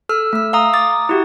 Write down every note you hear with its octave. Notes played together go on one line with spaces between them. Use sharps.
A4 E6 F6
A3 E6
F5 A#5 D#6
D6 D#6 A6
E4 F#4 G4